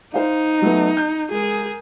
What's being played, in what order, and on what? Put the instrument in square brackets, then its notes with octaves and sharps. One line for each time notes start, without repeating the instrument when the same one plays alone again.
[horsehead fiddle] D#4 [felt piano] C5 F5
[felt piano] F#3 A3 B3
G6
[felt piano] G#3 [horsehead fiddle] G#4 A#4